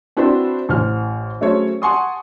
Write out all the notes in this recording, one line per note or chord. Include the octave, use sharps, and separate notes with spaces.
C4 D4 E4 F#4 B4 C5
A1 C5 F6
F#3 A3 C#4 G#4 C5 C#5
F#5 G#5 A5 C6 C#6 D#6